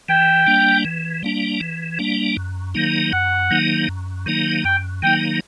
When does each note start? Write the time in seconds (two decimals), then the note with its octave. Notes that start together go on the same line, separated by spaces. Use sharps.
0.09 E3 G5
0.47 G3 A#3 D4
0.84 E3
1.23 G3 A#3 D4
1.61 E3
1.99 G3 A#3 D4
2.37 F#2
2.75 D#3 F#3 A#3 D#4
3.13 F#2 F#5
3.51 D#3 F#3 A#3 D#4
3.88 F#2
4.26 D#3 F#3 A#3 D#4
4.64 F#2 G5
5.02 D#3 F#3 A#3 D#4 G5